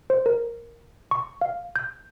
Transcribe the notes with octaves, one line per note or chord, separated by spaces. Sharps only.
C5
A#4
C#6
F5
G6